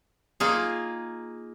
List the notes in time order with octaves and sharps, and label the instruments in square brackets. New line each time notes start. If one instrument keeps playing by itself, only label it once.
[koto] A#3 D#4 F4 G#4